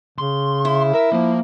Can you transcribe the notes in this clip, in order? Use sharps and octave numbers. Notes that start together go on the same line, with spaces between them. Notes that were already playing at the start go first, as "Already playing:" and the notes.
C#3 C6
E4
A#4 E5
F3 A#3